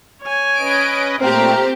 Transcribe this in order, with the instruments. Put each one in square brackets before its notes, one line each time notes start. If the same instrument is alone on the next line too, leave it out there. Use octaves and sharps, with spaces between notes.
[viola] C#5 G#5
[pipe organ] C#4 B4 D#5 [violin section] D7
[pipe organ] A#2 A3 [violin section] C4 G4 [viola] A#4 A#5